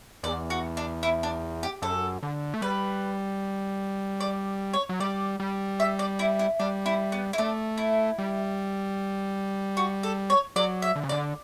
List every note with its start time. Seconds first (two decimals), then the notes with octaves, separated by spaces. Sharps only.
0.23 E2 D5
0.50 F#4
0.77 D4
1.03 E4
1.23 D4
1.63 G4
1.82 F#2 A4
2.23 D3
2.54 A3
2.62 G3 B4
4.21 D5
4.74 C#5
4.89 F#3
5.00 G3 D5
5.40 G3
5.80 E5
5.99 D5
6.19 E4
6.39 E4
6.60 G3 D4
6.86 E4
7.12 B3
7.33 E4
7.38 A3 D4
7.78 E4
8.18 G3
9.77 F#4
10.03 A4
10.30 C#5
10.56 F#3 D5
10.82 E5
10.96 D3
11.04 C#3
11.09 D3 D5